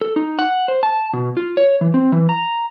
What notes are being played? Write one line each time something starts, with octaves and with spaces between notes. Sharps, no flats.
A4
D#4
F#5
C5
A5
B2
F4
C#5
E3
C4
E3
A#5